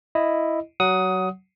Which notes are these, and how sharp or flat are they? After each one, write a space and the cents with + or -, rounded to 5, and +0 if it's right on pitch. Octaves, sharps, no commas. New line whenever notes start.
E4 +0 D#5 +0
F#3 +20 F#5 +0 D#6 +15